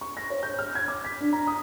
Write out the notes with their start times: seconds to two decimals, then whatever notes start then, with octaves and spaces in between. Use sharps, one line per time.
0.01 C#6
0.17 A#6
0.30 C#5
0.43 G6
0.59 F6
0.75 G#6
0.88 D6
1.05 B6
1.20 D4
1.33 A#5
1.47 D#6